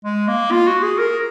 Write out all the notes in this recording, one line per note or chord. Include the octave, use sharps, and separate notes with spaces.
G#3
A#3
F4
F#4
G#4
A#4